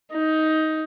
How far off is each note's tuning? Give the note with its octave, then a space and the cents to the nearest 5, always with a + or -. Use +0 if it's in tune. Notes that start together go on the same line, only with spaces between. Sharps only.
D#4 +15